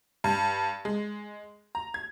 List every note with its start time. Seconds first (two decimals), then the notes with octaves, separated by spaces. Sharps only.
0.24 G2
0.85 G#3
1.75 A#5
1.94 G#6